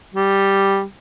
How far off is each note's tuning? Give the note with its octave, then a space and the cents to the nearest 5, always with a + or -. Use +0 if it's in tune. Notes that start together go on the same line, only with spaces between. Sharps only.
G3 +0